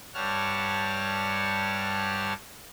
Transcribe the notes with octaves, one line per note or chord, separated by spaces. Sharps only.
G2 G3 C#5 F#5 A5 F6